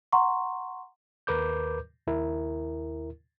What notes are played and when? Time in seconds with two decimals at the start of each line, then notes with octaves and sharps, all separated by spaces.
0.12 F#5 A#5 C6 C#6
1.27 D#2 A#4 B4 D6 G6
2.07 D#2 E4 A#4